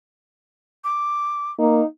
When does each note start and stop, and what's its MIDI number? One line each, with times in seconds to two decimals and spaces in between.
0.84 1.52 86
1.59 1.81 58
1.59 1.86 63